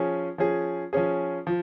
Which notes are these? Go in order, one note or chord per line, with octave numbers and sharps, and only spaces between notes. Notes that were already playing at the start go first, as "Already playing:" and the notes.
Already playing: F3 C#4 G#4
F3 C#4 G#4
F3 C#4 G#4
F3